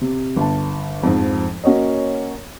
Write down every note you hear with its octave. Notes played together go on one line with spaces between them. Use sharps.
C3
G1 A5
F2 G#2 F3
A#3 C#4 F#4 C#5 D#5